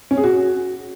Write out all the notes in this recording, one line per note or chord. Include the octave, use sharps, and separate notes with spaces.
C#4
G#4
F#4